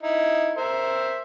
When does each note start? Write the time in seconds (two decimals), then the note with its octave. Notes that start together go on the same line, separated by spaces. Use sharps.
0.03 D#4 E4
0.57 A#4 C5 E5